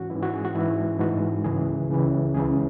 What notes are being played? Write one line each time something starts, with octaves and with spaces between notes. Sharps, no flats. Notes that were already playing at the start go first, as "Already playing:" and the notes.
Already playing: G#2 E3 C#4 F#4
G#2 E3 E4
F#4
G#4
F#4
G#2 E3 E4
G#2 E3 F#4
C#2 C#3 E3 G#4
C#2 C#3 E3
C#2 C#3 E3 G#4